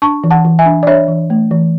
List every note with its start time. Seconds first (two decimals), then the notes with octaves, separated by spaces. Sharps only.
0.02 D4 A5 C#6
0.24 E3
0.31 F#5 A5
0.45 E3
0.59 E5 G#5
0.66 D4
0.83 D5
0.87 D4 C#5 E5
1.08 E3
1.30 A3
1.51 E3